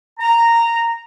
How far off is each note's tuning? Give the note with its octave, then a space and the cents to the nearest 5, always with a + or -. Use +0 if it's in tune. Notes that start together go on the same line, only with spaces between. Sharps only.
A#5 -10